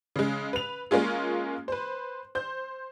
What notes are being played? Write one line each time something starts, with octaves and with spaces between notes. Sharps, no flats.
C#3 G#3
B4 F7
G#3 A#3 C#4 F4 G#4
B4 C5
C5 G6